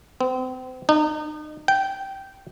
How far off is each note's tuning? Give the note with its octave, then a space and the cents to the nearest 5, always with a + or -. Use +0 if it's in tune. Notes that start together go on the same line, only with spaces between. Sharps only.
C4 -35
D#4 -35
G5 -15